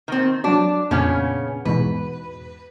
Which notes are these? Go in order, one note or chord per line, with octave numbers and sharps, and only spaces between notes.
D#3 C4 A#4
F#3 D4 F#4
F2 A#2 C#3 B3 C#4 F6
E2 G#2 B2 B4